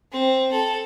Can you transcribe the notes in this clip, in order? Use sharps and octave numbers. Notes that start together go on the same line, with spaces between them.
C4
A4